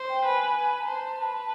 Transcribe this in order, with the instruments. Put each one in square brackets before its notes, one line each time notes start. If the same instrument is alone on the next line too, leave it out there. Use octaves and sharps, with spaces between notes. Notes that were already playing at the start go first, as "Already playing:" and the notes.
Already playing: [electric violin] C5
[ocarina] G5
[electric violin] B4 [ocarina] G#5
[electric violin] B4
[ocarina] A#5
[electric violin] C5 [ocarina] A5
[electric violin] B4 [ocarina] A5